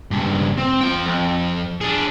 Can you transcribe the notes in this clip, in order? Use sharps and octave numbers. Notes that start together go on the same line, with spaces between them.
C#2 G2
C4
F4 G5
F2
D4 G#4